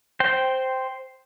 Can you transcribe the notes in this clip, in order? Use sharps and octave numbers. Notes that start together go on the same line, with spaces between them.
C5 G5